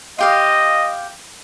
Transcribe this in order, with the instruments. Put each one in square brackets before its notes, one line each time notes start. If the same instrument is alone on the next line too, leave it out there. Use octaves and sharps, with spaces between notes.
[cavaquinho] F4 G4 F5 [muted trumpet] D#5